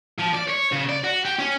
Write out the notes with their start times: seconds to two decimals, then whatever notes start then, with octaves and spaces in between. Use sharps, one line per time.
0.19 F3
0.35 D5
0.50 C#5
0.73 C#3
0.89 D5
1.04 F#4
1.25 G4
1.39 C#4